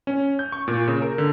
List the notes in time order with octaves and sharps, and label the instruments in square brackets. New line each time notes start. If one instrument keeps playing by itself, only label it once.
[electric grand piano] C#4
G6
C#6
A#2
C#3
A#4
D3